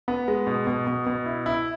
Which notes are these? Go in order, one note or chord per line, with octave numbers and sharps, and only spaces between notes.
B3
G#3
B2
B2
B2
B2
E4
E4